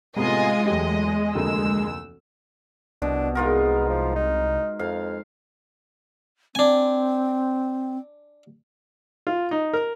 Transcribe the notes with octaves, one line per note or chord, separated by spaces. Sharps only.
A2 C3 G#3 B3 F4 D#5 G#5
E2 F#3 A3 G4 D#5
F1 D2 A#3 E6
C2 B2 D4
G#2 B3 F4 A#4
F3
D#4
F2 F5
C4 D4 G#5
F4
D#4
A#4